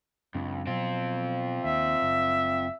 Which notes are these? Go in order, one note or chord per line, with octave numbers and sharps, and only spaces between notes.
C#2 F#2 C4 D4
B2 F#3 C4 F4
D#2 E5
F#1